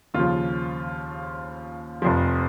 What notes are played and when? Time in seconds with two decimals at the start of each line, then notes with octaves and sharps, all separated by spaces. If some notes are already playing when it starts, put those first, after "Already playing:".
0.14 D#2 C#3 F3 F4
2.02 F1 F2 F3